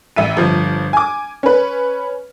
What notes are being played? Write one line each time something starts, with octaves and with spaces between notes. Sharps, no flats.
A1 E5 D#7
G1 F3
G#5 D6
C#4 B4